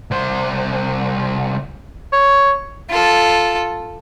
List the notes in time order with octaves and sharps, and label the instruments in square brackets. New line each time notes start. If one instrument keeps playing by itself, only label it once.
[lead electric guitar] C2 C5
[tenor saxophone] C#5
[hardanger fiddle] F4 A4